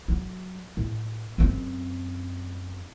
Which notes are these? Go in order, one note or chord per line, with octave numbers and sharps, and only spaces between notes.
F#3
A2
F#2 C4